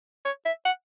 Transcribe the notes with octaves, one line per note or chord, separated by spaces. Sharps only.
C#5
E5
F#5